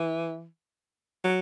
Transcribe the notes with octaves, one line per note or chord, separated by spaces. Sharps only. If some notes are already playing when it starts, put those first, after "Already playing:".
Already playing: E3
F#3